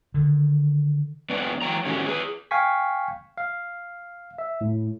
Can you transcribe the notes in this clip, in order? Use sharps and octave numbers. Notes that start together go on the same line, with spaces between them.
D3 D#3
F2 B3 D4 B4 D5
E3 F#3 G5 A#5
A2 D#3 A3 C#4 F#4 G4
G#4 B4
F5 G5 G#5 C#6 B6
F5
E5
A2